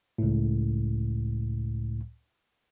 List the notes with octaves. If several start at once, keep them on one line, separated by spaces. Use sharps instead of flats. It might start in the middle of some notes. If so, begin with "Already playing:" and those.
C#2 A2